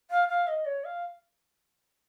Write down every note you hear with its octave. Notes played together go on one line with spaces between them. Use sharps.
F5
F5
D#5
C#5
F5